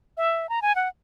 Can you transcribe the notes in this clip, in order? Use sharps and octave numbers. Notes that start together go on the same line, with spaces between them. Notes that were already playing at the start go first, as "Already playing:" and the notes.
E5
A#5
G#5
F#5